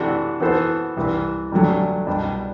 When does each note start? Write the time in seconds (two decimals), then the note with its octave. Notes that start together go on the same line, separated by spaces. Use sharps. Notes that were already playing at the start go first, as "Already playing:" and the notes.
Already playing: C3 E3 A3 D4 F#4
0.40 E3 B3 F#4 A4 C5
0.96 C2 C3 E3
1.52 A1 G2 D3 F#3 A3
2.07 C2 B2 G3 D4